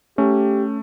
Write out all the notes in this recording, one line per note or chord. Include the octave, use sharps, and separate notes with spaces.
A3 C#4 G4